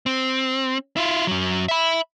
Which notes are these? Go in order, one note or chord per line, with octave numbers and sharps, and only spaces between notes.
C4
E4 F4
F#2 F#3
E5 B5